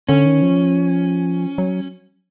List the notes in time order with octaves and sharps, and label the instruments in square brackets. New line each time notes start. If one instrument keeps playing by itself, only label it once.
[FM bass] D3 [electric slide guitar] C#4
[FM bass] D#3
F3
F#3